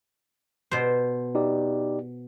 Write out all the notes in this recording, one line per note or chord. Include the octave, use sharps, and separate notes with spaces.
B2 C5
D#4 G4 D5